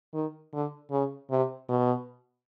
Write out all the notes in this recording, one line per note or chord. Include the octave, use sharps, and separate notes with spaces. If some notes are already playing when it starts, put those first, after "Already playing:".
D#3
D3
C#3
C3
B2